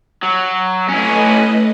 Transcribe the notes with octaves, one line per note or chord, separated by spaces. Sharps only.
F#3
A3 C#4 E4 B4 D#5